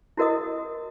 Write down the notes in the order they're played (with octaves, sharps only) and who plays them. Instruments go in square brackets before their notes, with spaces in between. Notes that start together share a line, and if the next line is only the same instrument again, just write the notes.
[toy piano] E4 F#4 A#4 D#5 D#6